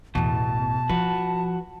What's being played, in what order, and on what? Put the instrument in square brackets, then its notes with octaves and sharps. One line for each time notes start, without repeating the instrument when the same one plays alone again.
[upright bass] A1 E2 [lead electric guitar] B2 [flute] A5
[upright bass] F3 [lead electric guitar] F#4 B4